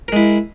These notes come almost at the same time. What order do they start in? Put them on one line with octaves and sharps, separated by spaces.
A#4 G#3 E4